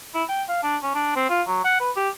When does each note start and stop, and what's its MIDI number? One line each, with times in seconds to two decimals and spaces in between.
0.14 0.24 64
0.29 0.43 79
0.48 0.60 77
0.63 0.77 62
0.82 0.94 61
0.95 1.11 62
1.16 1.27 60
1.29 1.42 65
1.47 1.62 54
1.64 1.80 78
1.80 1.90 71
1.96 2.09 67